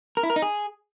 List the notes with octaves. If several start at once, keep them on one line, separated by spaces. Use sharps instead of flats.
A#4
E4
A#4
D#4
G#4